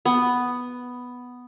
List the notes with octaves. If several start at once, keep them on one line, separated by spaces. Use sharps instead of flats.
B3